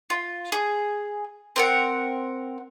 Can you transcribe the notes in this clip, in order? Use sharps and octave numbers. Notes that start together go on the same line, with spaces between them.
F4
G#4
C4 A#4 F#5